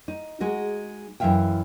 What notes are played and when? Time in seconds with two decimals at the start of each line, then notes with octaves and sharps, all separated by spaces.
0.08 D#4
0.40 G#3 D#4 F#4
1.20 F#2 E3 G#3 E5 F5 G5